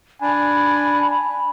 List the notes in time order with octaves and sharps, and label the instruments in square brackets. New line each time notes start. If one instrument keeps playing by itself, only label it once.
[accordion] D4 [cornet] G#5 [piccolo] B5